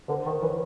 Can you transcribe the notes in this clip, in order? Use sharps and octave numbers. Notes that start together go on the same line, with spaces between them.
D3 A#4 C5
D#3
E3 B4 C#5